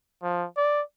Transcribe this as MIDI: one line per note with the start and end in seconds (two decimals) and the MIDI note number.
0.23 0.46 53
0.57 0.81 74